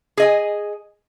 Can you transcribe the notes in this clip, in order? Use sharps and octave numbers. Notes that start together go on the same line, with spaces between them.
G#4 D#5 G#5